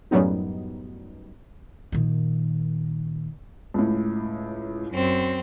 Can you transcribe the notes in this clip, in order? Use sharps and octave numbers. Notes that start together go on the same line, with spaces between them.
F#2 A2 F#3 G3 B3 D#4
A#2 D#3
C#2 A2
F#2 C4